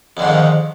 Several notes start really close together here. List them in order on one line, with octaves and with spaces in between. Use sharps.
F2 D3 G#2 D#3 F3